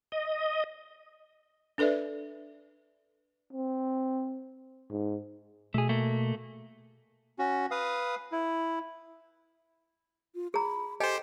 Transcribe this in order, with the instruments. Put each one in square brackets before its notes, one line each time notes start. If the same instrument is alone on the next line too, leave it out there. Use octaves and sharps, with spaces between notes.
[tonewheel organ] D#5
[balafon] D4 A4 B4 D5 E5
[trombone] C4
G#2
[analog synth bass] B2 [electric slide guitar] A3 G#4
[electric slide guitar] A3 A#3
[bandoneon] C#4 F#4
B4 F5 D#6
E4
[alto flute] F4
[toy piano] G#4 A#5 [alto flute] B5
[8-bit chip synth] G4 C5 [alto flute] A4 [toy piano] D#5 G5 G#5